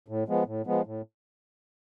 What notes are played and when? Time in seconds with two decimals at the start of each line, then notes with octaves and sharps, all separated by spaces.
0.08 A2
0.28 F3 G#3 B3
0.47 A2
0.66 F3 G#3 B3
0.86 A2